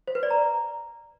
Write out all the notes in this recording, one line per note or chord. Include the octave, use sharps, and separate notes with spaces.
C5
B4
D5
A#5